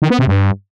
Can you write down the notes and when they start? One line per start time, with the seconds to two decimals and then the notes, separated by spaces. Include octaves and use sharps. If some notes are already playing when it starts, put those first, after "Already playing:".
0.02 D#3
0.10 B3
0.19 C3
0.27 G2